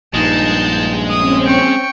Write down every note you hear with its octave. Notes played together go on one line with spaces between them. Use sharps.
A#1 G2 G#3 D#4 A5 G6
C4 C#4 D#6
G5 C#6